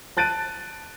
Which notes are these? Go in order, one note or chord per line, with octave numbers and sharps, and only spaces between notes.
A5 F#6 A6 D7 D#7